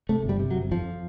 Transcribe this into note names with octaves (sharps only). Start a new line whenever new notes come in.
C3 A3
G1
G3
C3
F#3
G1
F2 F3